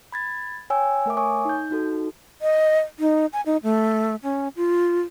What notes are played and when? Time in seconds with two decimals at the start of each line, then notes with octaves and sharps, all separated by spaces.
0.12 B5 G#6 A6
0.70 C#5 G5 G#5 E6
1.06 A3 A#4 E5 D6
1.17 C#5 G#5 C#6 D#6
1.45 D#4 G6
1.71 D#4 F#4 A4
2.42 D#5
2.99 D#4
3.33 G#5
3.46 D#4
3.63 A3
4.23 C#4
4.56 F4